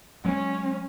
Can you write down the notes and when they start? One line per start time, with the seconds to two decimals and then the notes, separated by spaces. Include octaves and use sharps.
0.25 F#3 G#3 C#4